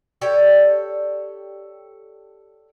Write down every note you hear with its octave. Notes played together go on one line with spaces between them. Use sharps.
G4 A4 C#5 D5